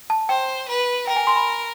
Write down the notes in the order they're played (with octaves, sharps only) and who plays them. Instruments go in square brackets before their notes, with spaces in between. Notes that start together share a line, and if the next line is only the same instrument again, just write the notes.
[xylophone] A5
[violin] C5 [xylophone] G5
[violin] B4
[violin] A#4 [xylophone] G5
[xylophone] G#5
C6
B5